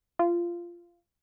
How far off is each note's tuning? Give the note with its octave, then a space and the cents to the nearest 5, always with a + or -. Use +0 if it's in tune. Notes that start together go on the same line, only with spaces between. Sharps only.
F4 -15